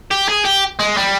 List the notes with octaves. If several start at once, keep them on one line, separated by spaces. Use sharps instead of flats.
G4
G#4
G4
G#3
G3